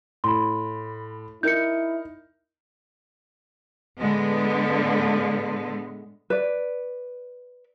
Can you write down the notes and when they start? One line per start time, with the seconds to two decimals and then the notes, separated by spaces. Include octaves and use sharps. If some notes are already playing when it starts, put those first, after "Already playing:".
0.24 A2 B5 C6
1.43 D#4 E4 A#4 G6 C#7
3.98 A2 D3 G#3 B3
6.30 B4 D5